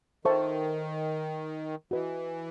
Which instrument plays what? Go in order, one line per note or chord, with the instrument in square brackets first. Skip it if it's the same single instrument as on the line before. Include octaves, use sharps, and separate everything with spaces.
[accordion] D#3 [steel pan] A4 C5 E5 A5 C#6
[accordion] E3 [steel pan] F#4 B4 D#5